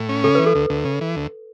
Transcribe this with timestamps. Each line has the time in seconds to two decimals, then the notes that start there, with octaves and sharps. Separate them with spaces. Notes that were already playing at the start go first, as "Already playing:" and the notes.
Already playing: A2
0.09 C#4
0.24 C#3 A4
0.35 E3 B4
0.46 A4
0.55 D2
0.70 D2
0.85 C#3
1.01 E3
1.16 D2